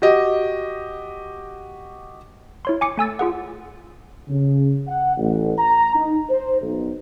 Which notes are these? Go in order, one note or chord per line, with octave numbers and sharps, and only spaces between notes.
F#4 G4 D#5
E4 C#5 C6
G#5 D6 C#7
A3 G#5 E6 A6
F4 G#4 F#5
C#3
F#5
A1
A#5
D#4
C5
B1